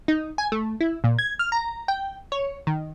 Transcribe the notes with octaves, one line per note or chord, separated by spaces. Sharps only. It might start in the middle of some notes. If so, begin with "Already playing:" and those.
D#4
G#5
A3
E4
A#2
G#6
F6
A#5
G5
C#5
D#3